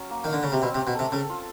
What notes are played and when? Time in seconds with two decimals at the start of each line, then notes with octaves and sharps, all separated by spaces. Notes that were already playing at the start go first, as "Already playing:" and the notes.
Already playing: F#3 C#4
0.10 A#3
0.24 D#3 F#3
0.33 D3
0.43 C#3 C#4
0.52 C3
0.62 B2 C4
0.75 C3
0.78 C4
0.87 B2
0.95 C3 A4
1.12 C#3 A4
1.30 F4